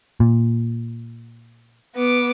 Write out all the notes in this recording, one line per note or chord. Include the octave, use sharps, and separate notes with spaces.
A#2
B3 D6